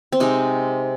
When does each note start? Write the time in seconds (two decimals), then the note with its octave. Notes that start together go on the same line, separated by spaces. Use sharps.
0.12 C4
0.20 C3 G#3 D#4